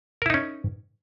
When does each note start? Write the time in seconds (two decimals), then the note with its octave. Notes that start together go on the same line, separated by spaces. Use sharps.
0.22 A#4
0.26 E4
0.30 D#4
0.34 C#4